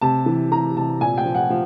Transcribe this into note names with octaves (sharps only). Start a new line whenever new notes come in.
C3 A5
E3
E3 A#5
C3 A5
A#2 G#5
G5
F3
F#5
F3